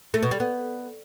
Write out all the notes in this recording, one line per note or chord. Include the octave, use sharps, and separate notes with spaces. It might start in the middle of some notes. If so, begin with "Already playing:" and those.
A3
B2
G3
B3